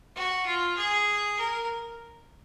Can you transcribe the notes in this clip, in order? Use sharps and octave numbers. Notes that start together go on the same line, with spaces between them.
F#4
F4
G#4
A#4